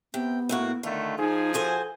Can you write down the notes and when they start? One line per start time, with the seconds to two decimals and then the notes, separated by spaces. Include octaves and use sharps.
0.14 C3 B3 G5
0.49 A2 A#3 F#4
0.83 D3 D#3 A3 F4
1.19 F3 D#4 G#4
1.54 F#4 A4 C5 G#5